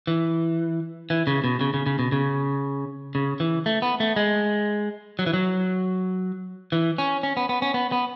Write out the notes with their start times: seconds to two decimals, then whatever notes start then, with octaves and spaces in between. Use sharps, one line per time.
0.07 E3
1.10 E3
1.27 C#3
1.44 B2
1.61 C#3
1.74 C#3
1.86 C#3
1.99 B2
2.12 C#3
3.15 C#3
3.40 E3
3.66 A3
3.82 B3
4.00 A3
4.16 G#3
5.19 F#3
5.26 E3
5.33 F#3
6.72 E3
6.98 C#4
7.23 C#4
7.37 B3
7.49 B3
7.62 C#4
7.74 B3
7.92 B3